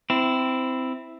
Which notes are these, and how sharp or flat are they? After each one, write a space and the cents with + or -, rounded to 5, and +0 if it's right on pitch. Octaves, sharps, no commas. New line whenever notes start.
C4 -15 E4 +0